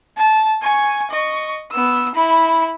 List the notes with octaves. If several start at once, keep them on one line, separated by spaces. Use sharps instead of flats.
A5
G#5 C#6
D#5 C#6
B3 E6
E4 B5